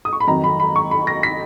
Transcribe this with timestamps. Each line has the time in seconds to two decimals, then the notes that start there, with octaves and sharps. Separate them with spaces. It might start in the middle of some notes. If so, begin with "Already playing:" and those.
0.05 D#6
0.13 C#6
0.20 B5
0.27 F2 D#3 F#3 A#5
0.44 B5
0.60 B5
0.76 C#6
0.91 B5
1.07 A#6
1.23 B6